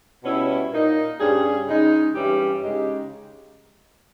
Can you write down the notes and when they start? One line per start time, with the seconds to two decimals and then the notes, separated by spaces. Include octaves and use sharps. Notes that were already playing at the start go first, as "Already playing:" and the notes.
0.24 B2 G3 C#4 E4
0.71 A#2 A#3 D#4
1.19 G2 G3 C#4 G#4
1.67 C#3 G#3 D#4
2.14 G2 E3 G3 C#4 G4
2.62 C#3 G#3 D#4 G4